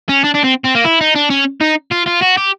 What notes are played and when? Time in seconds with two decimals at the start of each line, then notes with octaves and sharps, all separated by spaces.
0.09 C#4
0.24 D4
0.35 D4
0.45 C4
0.65 C4
0.75 A#3
0.85 E4
1.01 D#4
1.15 D4
1.30 C#4
1.61 D#4
1.91 F4
2.06 F4
2.21 F#4
2.37 G4